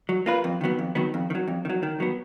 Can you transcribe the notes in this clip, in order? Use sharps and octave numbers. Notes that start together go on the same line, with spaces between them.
F#3
A#3 F4 B4
F2
D#3 F#3 B3
F2
D#3 F#3 B3
F2
D#3
F#3
F2
D#3
F#3
D#3
F#3 B3